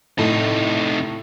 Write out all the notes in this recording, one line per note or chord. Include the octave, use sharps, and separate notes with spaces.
A2 C3 D#4